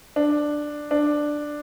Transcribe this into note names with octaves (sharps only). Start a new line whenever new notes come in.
D4
D4